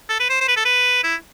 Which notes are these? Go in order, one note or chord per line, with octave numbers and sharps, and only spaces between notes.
A4
B4
C5
C5
B4
A4
B4
E4